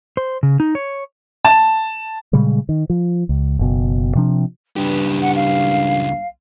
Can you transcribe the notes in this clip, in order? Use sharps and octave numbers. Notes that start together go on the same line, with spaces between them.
C5
C#3
D#4
C#5
A5
A#2 C#3 G3 G#3
D#3
F3
C#2
F#1 B2
C3 F3 D4
C#2 G2 G4 B4
F#5
F5